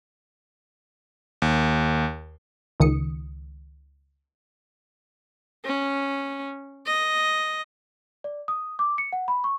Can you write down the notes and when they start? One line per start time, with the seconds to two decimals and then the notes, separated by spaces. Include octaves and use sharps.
1.42 D#2
2.80 C#2 D#3 D#6 C#7
5.65 C#4
6.87 D#5
8.24 D5
8.48 D#6
8.79 D6
8.98 C#7
9.13 F#5
9.28 B5
9.44 C#6